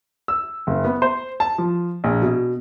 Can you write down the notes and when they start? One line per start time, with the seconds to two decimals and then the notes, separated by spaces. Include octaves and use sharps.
0.28 E6
0.67 F#1
0.84 B3
1.02 C5
1.40 A5
1.58 F3
2.04 A#1
2.22 B2